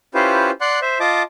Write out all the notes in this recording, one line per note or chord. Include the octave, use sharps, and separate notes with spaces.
C#4 E4 F4 G4 B4 C5
D5 F#5 C6 F#6
C5 E5
F4 D#5 A5 D6